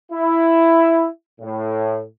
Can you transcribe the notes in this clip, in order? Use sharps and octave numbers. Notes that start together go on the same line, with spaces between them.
E4
A2